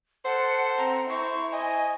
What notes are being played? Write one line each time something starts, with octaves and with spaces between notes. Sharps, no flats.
A4 C5 F#5
C4 A#5
E4 C5 C#6
D#5 G#5